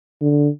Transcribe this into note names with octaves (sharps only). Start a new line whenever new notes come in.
D3